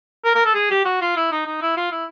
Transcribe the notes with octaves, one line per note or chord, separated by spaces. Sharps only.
A#4
A#4
A4
G#4
G4
F#4
F4
E4
D#4
D#4
E4
F4
E4